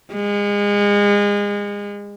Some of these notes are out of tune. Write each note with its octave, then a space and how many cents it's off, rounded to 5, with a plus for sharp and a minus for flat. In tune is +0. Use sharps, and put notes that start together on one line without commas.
G#3 -30